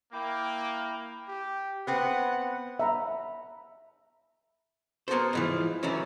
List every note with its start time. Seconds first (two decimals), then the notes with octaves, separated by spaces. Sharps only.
0.13 A#3 E4 G5 D6
1.28 G4
1.87 B3 C4 F#5
2.79 E5 A#5 B5
5.08 A#3 B3 F#4 A4 C5
5.33 G#2 E3 F3
5.83 D#3 E3 F#3 A3 C#4